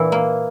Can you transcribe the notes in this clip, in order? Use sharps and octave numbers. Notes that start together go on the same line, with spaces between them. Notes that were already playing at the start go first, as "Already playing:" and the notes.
Already playing: A#2 E3 E4
A#3